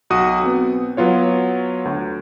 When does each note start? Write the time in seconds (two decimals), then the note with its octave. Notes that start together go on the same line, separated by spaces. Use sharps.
0.10 B1 F#4 D#6 D#7
0.44 B3 C4
0.97 F#3 B3 F4 C#5
1.85 D2